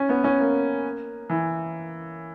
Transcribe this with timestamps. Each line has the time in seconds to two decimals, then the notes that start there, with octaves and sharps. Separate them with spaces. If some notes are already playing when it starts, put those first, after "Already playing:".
Already playing: C#4
0.09 B3
0.24 C#4
0.39 A#3
1.30 E3